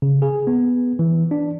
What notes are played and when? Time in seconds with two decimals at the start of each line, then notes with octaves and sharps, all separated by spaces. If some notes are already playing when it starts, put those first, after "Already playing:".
0.02 C#3
0.22 G#4
0.47 B3
0.99 E3
1.31 D4